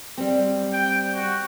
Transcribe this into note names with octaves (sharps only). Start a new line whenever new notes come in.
G3 C4
G5
F#4